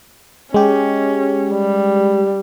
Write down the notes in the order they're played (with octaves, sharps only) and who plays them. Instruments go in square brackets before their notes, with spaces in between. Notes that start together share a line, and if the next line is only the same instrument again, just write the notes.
[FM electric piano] G#3 G4 [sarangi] C#4
[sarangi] G3